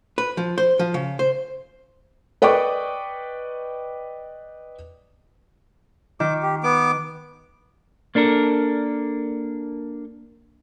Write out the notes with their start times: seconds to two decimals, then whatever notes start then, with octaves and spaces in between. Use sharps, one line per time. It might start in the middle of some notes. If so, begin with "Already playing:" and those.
0.18 B4
0.37 F3
0.58 C5
0.79 F3
0.94 C#3
1.19 C5
2.42 B4 D5 D#5 G5 C#6 D6
6.20 D#3 D6
6.43 G4
6.63 B3 D6
8.15 A#3 D4 A4 A#4